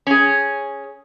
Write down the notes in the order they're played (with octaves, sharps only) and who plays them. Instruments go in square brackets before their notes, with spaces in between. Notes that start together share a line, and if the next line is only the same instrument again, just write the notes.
[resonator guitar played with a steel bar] C#4 G#4